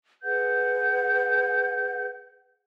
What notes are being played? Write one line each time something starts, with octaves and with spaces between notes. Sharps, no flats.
G#4 B4 F#5 G6